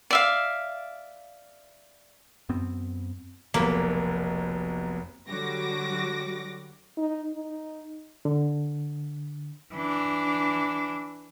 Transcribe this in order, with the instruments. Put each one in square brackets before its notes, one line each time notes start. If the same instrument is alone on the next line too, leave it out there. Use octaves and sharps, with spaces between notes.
[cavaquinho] D5 E5 F5
[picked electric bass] F#2 B3 C4
[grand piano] F1 B1 [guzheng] A#3 B5
[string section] D3 F#3 G3 F#4 D6 A#6
[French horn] D#4
D#4
[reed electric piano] D3
[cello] E3 D4